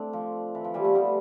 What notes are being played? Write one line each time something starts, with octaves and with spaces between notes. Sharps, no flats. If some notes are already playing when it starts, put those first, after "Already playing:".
Already playing: A3 C4 D4
F3
E3
F3
E3 G3
F3 A3
G3 B3